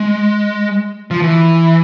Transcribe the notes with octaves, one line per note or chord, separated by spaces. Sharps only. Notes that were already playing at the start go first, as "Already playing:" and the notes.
Already playing: G#3
F3
E3